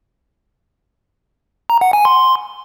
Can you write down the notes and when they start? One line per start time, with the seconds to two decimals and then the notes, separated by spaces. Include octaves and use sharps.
1.70 A#5
1.81 F#5
1.93 G#5
2.05 C6